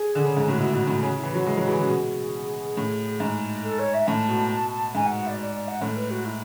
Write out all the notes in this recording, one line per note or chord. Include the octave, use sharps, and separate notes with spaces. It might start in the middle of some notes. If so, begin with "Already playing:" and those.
Already playing: G#4
D3
C#3
G#2
A2 F#4
B2 E4
B2 F#4
A2 F#4
C#3 F#4
E4
E3
F#3 F#4
G#3 E4
F#3 F#4
E3 G#4
C#3 F#4
B2 G#4
A2
G#2
A4
C#5
E5
A2 A5
B2
G#2 G#5
F#5
F#5
D5
D5
D5
F#5
A2 A4
B4
F#4
E4